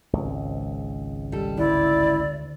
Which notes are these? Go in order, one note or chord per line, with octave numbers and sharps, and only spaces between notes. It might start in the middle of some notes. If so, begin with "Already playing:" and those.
G#1 C#2
G3 A4
D2 E4 D5